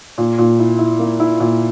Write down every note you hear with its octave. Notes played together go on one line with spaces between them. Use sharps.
A#2
A#2
E4
E4
A#3
E4
A#2